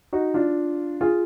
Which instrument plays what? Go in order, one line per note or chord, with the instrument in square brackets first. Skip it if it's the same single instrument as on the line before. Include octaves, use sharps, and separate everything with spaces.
[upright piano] D#4 F#4
D4 F4
F4 G#4